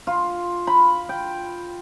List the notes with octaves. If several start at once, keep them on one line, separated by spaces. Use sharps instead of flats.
F4
B5
G5